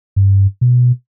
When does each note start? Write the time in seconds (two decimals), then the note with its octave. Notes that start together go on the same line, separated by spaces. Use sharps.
0.16 G2
0.61 B2